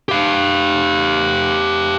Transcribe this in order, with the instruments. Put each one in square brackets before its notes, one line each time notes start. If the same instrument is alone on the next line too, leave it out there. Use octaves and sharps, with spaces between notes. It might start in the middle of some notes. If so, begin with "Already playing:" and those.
[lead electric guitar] G4 F5